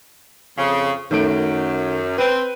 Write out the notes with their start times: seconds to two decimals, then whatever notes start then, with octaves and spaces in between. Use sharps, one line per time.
0.58 F2 C#3
1.11 F#2 D#3 A3 D7
2.18 C4 B4